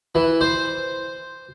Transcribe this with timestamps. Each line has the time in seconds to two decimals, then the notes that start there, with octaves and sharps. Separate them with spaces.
0.15 E3
0.41 C5